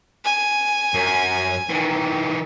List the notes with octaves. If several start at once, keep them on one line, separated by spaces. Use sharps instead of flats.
G#5
F#2
D#3 E3